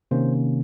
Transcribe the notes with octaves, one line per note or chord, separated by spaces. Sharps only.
C3 D#3 A#3 C#4 C5